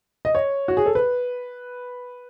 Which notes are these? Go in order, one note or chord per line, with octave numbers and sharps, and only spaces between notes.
D#5
C#5
F#4
G#4
A4
B4